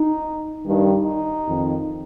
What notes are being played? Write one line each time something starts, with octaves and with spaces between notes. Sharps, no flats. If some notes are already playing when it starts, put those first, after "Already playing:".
Already playing: D#4
G2 D#3
D#4
F2 D#3